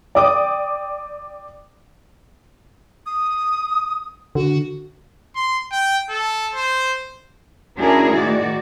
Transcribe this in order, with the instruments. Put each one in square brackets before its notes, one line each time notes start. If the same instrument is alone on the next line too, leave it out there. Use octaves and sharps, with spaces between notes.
[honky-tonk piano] D5 G5 D6 D#6
[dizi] D#6
[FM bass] D3 [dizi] F#4
[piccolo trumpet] C6
G5
A4
C5
[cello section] C#4 D4 E4 F#4 G#4 A#4
A2 D#3 F#4 D5